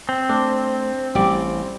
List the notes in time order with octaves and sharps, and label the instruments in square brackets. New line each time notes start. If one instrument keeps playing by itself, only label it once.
[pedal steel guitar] C4
[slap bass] A3 [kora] D4
[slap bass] A1 [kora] G3 D5